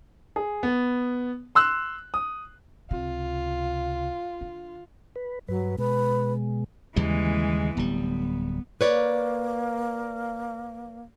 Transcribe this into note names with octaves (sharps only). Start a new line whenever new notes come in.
G#4
B3
C6 E6 F#6
D#6
C#2 C3 F4
D3 D4
B4
G2 F#3 B4
B2 G#3 B4
D#2 C#3 E3 G3 G#3
D1 G3 B3
A#3 B4 C#5 D5